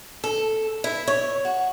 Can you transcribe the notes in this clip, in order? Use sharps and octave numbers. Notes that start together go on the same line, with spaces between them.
A4
E4
C#5
F#4